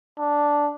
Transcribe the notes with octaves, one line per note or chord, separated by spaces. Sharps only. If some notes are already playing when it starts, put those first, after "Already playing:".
D4